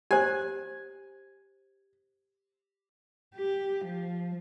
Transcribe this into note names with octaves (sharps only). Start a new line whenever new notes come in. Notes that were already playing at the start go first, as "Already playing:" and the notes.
G4 C5 G#5
G4
F3